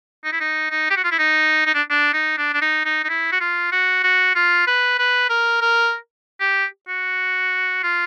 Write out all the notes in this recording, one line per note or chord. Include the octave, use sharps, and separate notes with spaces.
D#4
E4
D#4
D#4
G4
F#4
F4
E4
D#4
D#4
D4
D4
D#4
D4
D4
D#4
D#4
D#4
E4
F#4
F4
F#4
F#4
F4
B4
B4
A#4
A#4
G4
F#4
F4